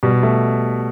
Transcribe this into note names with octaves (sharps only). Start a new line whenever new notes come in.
B2 G3
A3